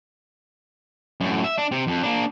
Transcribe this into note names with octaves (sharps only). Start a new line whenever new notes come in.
F#2 A2
E5
D4
C3
F2
A#3 D4